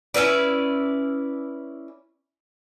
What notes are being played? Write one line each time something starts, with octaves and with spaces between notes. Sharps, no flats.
C#4 E4 B4 D5